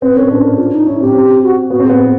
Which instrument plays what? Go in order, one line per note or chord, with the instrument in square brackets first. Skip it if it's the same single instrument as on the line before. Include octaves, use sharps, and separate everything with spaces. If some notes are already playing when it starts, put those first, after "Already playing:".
[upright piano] C4 [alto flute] B4
[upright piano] C#4 [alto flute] A#4
[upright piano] D4 [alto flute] B4
[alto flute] A#4
F4
D#4
[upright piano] C#4 [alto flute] E4
[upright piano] C4 [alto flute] G4
[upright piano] C4
[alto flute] F#4
[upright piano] B3 [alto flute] F#4
[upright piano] C4
[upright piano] B3 [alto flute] G#4